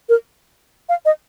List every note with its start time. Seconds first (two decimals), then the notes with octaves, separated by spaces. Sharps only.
0.09 A#4
0.89 F5
1.05 D#5